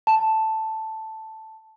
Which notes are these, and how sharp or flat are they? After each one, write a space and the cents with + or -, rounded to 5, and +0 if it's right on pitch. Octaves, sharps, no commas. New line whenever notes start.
A5 +0